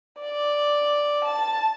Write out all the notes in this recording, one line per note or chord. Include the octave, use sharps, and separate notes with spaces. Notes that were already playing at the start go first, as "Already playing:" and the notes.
D5
A5